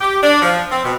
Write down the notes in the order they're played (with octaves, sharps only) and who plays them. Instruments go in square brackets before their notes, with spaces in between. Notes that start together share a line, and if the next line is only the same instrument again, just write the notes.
[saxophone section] G4
D4
F3
C4
B2